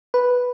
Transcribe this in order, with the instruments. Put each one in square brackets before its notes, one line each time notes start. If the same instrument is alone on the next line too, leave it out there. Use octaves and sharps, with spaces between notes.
[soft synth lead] B4